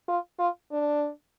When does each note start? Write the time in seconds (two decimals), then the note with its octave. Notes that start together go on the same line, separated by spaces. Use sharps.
0.08 F4
0.39 F4
0.72 D4